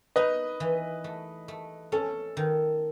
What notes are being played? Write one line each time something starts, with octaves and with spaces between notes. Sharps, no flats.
D#4 B4 D#5
E3
A3
A3
C#4 A4
D#3